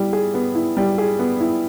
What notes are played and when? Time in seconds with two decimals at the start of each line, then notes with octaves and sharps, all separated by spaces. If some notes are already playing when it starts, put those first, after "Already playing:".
Already playing: G3 E4
0.13 G#4
0.34 B3
0.55 E4
0.77 G3
0.98 G#4
1.19 B3
1.40 E4